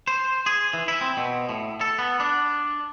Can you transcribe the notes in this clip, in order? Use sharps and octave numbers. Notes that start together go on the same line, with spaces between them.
C5
G#4
E3
E4
C4
B2
A2
A4
B3
D4